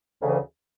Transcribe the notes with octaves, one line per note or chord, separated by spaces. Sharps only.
D2 C#3 E3